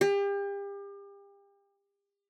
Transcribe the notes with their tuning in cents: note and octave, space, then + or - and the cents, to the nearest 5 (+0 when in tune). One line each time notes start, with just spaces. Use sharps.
G4 +35